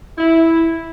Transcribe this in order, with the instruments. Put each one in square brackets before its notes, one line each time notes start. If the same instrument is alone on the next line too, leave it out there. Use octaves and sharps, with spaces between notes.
[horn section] E4